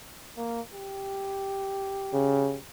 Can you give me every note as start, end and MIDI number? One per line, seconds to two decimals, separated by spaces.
0.37 0.61 58
0.74 2.66 67
2.13 2.56 49